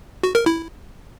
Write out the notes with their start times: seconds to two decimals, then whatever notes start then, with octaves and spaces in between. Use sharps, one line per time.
0.23 F#4
0.35 A#4
0.46 E4